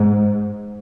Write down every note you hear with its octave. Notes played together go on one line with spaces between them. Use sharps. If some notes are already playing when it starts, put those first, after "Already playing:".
Already playing: G#2